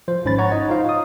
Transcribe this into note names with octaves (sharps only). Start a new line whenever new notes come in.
F3 C5
G#1 G#2 C#4 C5 B5 A6
C#5 F#5 A#5 C#6
D#4 D#5
D#4 F4 C5 F5
D#6